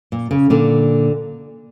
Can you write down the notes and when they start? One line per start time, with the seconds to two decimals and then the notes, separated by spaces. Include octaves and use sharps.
0.12 A#2
0.31 C#3
0.50 A#2 D3